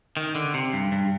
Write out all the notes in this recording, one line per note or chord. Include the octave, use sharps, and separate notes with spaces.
D#3
D3
C3
G2
G2